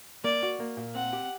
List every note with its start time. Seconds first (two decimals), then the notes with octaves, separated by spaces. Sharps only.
0.24 A#3 D5
0.43 F#4
0.60 A#3
0.77 A#2
0.95 C4 F#5
1.13 G4